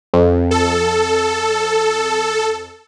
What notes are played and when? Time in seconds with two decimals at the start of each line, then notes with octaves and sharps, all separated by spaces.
0.14 F2
0.51 A4